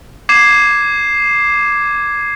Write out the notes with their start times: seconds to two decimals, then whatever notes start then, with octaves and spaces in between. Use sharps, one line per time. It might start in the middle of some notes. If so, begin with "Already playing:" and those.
0.29 D6 G#6 C7 E7